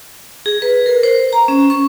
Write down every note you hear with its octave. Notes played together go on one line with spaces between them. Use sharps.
G#4
B4
A#4
C5
A#5
C#4
C#6